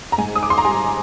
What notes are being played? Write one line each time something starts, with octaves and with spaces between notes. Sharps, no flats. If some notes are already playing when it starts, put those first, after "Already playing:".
A#5
G#2 G#5
D#6
D6
C6
A#5
G3 G#5